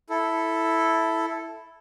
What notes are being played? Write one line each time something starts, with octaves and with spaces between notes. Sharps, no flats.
E4 A4